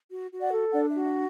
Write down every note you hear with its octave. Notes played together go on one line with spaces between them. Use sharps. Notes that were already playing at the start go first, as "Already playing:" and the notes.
F#4
F#4
D5 F#5
A4
D4 D5 F#5
E5
F#4
E5